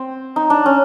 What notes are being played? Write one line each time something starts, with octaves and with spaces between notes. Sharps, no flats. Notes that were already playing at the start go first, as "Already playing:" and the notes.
Already playing: C4
D#4
D4
C#4